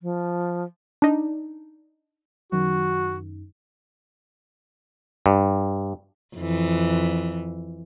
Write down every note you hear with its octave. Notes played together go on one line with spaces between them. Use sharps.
F3
D4 D#4
F#2 D#3 F#4
G2
F2 E3